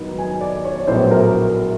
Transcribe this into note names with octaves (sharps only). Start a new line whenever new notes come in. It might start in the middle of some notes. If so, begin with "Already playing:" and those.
Already playing: G#2 D#3 F#3 B3
G#5
D5
C#5
C#5
A#1 A2 F#3 B3 C5
A#4